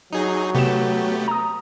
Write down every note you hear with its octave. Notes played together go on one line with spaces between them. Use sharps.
F#3 D#4 G#4
C3 A3 B3 G4 E7
A#5 D#6